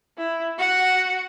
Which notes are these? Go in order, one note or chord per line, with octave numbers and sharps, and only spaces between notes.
E4
F#4 F#5